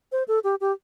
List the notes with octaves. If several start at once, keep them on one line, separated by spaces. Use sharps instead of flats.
C5
A4
G4
G4